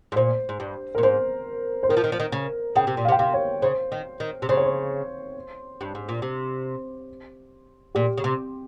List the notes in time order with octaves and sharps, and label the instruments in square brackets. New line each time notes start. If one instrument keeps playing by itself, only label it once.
[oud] G#2
[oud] A#2 [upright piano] C5
[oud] G#2
G2
[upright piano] A#4
[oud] A#2
[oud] G#2 [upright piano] C5
[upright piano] C5
[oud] D#3 [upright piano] A#4
[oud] F3
D#3
F3
D#3
C#3
[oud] C#3 [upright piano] G5
[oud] C3
A#2
[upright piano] F5
[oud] C3
[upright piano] G5
[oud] C3 [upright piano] F5
[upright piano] C#5
[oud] C#3 [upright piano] C5
[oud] D#3
D#3
C3
[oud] C#3 [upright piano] C5
[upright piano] C#5
C5
[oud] G2
G#2
A#2
C3
[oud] A#2 [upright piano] G4
[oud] C#3
C3